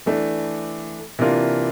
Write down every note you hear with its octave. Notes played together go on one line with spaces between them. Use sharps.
E3 A3 D4
C3 E3 A#3 D4 F4